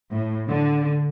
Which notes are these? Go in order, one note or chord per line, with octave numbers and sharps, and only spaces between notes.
A2
D3